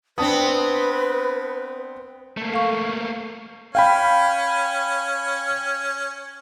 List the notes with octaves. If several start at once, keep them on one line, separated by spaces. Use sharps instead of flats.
B3 C4 D4 B4 A5 D#6
A3 A#3
A4 F5 C#6
C#4 F5 G5 B5